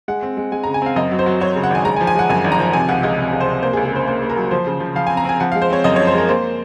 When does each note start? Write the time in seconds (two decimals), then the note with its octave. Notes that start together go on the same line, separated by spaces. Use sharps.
0.08 G#3 F#5
0.22 C4
0.37 G#3
0.52 G#3 G#5
0.64 A#5
0.66 C#3
0.74 G#5
0.82 C4 F5
0.96 F#2 D#5
1.12 F#3
1.19 C5
1.26 F#3
1.41 F#3 C#5
1.56 C#3
1.63 F#5
1.70 G#1 G#5
1.85 G#3 A#5
1.96 G#5
2.01 F3
2.07 G#5
2.15 G#3 F#5
2.29 F#2 G#5
2.44 G#1
2.52 A#5
2.59 F3
2.73 C3 G#5
2.89 C#2 F#5
3.03 C#2 D#5
3.18 C3
3.33 C#2
3.40 C5
3.48 C3
3.63 A#3 C5
3.73 G#4
3.77 C#2
3.85 G#4
3.92 C#3 C5
4.08 A#3 C5
4.22 A#3
4.30 A#4
4.37 F#3
4.51 F3 C5
4.67 C#3
4.80 F3
4.95 F3 F5
5.07 G#5
5.10 C4
5.17 A#5
5.25 C4 G#5
5.40 F3 F#5
5.52 F5
5.55 G#3
5.62 C5
5.70 C4 C#5
5.84 F#2 D#5
5.96 C#5
6.00 F3
6.07 C5
6.14 G#3 A#4
6.28 A#3 C5